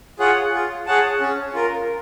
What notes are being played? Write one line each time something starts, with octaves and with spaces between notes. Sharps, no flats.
F4 G#4 C#5 F#5
F4
G#4 C#5 F#5 A5
C#4
F4 A#4